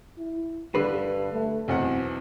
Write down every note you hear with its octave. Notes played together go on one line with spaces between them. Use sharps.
E4
G2 D3 B4 C7
A3
B1 E2 C4 F#5